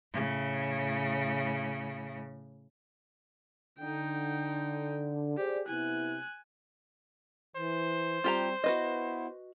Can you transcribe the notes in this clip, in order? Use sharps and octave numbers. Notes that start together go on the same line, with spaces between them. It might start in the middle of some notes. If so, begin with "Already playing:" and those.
A2 C#3
D3 D#4 G5
G4 G#4 C5 D5
C3 B3 E4 G#5 F#6
E3 C5
G3 C4 F4 G4 A#5
B3 E4 F#4 B4 D#5